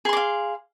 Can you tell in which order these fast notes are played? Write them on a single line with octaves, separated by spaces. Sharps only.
G#4 C6 D6 F5